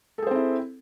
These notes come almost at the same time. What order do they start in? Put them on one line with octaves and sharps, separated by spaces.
A4 G#4 C5 C4 E4